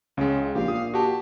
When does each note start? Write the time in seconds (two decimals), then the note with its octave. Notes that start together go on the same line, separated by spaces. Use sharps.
0.17 C#2 C#3 G#3
0.55 A#1 G4 F5
0.68 A#2 D#6
0.94 F#4 G4 A5